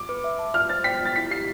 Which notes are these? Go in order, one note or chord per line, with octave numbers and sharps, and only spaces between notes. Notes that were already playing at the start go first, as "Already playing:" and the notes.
Already playing: D6
B4
E5
A5
F4 F6
C5 A6
G5 B6
F4 A6
E4 B6
G4 C7